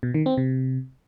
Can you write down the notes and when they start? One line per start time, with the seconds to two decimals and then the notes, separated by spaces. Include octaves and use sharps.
0.03 B2
0.14 D#3
0.26 C4
0.37 C3